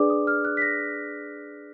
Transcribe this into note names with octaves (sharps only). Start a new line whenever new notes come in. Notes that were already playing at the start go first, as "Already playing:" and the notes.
Already playing: D4 G#4 B4 D5 D6
D#6
F6
F#6
B6
A#6